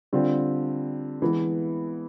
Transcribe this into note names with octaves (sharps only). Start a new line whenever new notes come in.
D3 G3 C4 F4
E3 G#3 B3